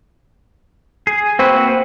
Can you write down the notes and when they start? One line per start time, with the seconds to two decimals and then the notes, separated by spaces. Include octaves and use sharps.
1.07 G#4
1.39 A#3 C4 F#4 B4